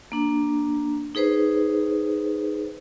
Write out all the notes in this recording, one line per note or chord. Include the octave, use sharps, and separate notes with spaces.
A#3 D4
D#4 G#4 B4 C5